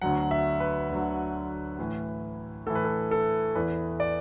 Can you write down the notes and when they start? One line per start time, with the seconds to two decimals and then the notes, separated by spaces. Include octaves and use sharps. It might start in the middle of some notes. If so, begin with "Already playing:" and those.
0.01 D2 D3 F#3 F#5
0.31 E5
0.60 B4
0.90 D2 D3 F#3
1.79 A2 E3
2.67 A2 E3 A4
2.75 B4
2.84 A4
3.11 A4
3.55 E2 E3 B4
4.00 D5